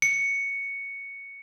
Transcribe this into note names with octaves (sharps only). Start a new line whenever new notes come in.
C#7